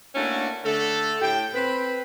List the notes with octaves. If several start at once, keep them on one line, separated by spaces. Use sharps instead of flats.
A3 A#3 C#4 D4 E4 F#4
D3 A3 A4
A2 G5
C4 B4 B5